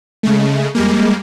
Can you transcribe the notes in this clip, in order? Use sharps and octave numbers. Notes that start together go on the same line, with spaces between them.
C#3 G#3 A3
F2 G3 G#3 A#3